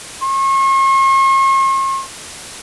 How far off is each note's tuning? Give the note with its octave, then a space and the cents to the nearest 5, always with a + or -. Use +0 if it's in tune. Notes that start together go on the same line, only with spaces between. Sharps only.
C#6 -45